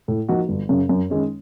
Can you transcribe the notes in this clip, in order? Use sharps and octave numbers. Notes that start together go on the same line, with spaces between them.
A2
F3 A#3 D#4 F#4
G1
F#2 C#3
F#2
D#3 G#3 C#4